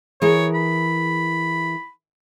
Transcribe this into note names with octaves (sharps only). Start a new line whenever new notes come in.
E3 G#4 A#4 C#5
B5